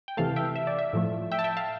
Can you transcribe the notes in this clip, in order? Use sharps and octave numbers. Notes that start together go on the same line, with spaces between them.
G5
C3 E3 A3 F5 A5
E5 G5
E5
D5
E5
A2 F3 A3
E5 G5
A5
E5 G5
F5 A5